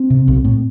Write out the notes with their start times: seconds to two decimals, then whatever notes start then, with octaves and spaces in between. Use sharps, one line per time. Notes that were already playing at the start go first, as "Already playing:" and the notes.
Already playing: C4
0.10 C3
0.28 B1
0.45 A2